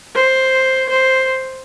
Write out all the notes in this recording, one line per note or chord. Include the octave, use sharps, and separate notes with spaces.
C5
C5